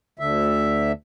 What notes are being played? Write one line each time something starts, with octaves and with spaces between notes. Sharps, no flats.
D2 D3 E5